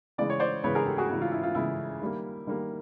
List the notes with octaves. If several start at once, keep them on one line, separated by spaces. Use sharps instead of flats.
C#3 E3 G#3 D5
C#5
C5 D5
C#3 E3 G#3 B4 C#5
G#4 A#4
G4 A4
F#4 G#4
C#3 E3 G#3
F4
E4
F4
C#3 E3 G#3 E4
D#3 G3 A#3
D#3 G3 A#3